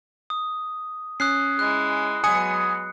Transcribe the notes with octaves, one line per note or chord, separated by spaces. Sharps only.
D#6
C#4 D#6 F#6 C7
G#3 E4 F#6
F#3 G#3 B3 G#5 D#6 C#7